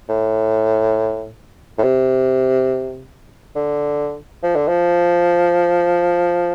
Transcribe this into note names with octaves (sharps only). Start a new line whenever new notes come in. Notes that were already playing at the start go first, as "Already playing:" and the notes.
A2
A2
C3
D3
F3
D3
F3